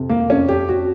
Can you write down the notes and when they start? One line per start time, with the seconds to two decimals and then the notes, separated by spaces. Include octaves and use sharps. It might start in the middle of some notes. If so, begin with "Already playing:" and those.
Already playing: F2 C3
0.09 A#3
0.30 F2 C#4
0.49 G4
0.69 F#4